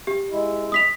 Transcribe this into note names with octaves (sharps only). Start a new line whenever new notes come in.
G4
G#3 E4
D#6 B6 F7